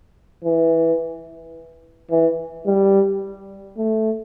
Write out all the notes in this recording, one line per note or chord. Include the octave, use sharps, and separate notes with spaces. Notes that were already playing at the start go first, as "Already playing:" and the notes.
E3
E3
G3
A3